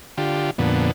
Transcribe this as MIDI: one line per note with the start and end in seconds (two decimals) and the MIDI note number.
0.18 0.51 50
0.18 0.51 65
0.18 0.51 67
0.58 0.91 41
0.58 0.91 46
0.58 0.91 50
0.58 0.91 59